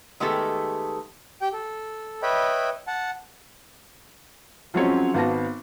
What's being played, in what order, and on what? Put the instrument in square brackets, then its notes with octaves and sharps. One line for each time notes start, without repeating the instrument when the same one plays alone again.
[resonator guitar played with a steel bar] D#3 G#3 A3 B3 G4 A4
[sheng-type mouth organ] G4 G5
A4
B4 C#5 D#5 E5 G5 B5
F#5 A5
[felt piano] F3 F#3 G#3 C4 C#4 C#5
G#1 B3 F#4 F5 A5 A#6